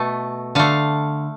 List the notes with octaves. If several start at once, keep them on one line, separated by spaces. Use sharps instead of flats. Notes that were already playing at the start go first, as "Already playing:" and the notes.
Already playing: B2 A3
D3 A3 F5